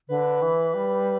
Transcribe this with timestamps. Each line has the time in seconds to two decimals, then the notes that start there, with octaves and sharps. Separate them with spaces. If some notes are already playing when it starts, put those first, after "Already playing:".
0.09 D3 B4
0.42 E3
0.74 G3